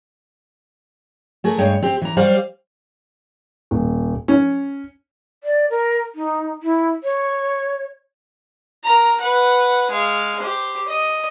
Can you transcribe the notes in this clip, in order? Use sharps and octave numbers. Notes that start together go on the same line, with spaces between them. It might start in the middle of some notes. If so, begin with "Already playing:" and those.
A3 G#4 A#4
G2 G#3 C#5 G5
C4 G4
E3 A#5
F#3 G3 C5 D5 F5
D#1
C#4
D5
A#4
D#4
E4
C#5
A#4 A#5
B4 F#5
G#3 F5
G4 C5
D#5